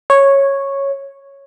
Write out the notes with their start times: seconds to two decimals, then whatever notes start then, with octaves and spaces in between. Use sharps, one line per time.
0.10 C#5